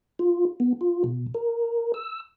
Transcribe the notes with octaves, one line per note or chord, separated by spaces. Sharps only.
F4
B3
F4
B2
A#4
E6